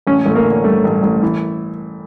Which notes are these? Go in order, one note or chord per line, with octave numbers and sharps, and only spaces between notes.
A1 C#4
A1 A3
A#3
D3
G2 A3
A1
A1
E3